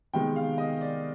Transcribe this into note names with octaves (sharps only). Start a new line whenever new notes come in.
C3 D#3 G#3 B3 G5
F5
D#5
D5